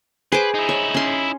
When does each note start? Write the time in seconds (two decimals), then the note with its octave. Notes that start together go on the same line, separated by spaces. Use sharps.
0.32 G#4 B4 C5 D6
0.54 D#4 E4
0.69 C#5
0.94 C#4 C6